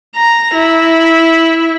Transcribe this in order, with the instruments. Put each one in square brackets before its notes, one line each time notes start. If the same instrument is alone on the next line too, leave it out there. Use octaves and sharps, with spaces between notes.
[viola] A#5
E4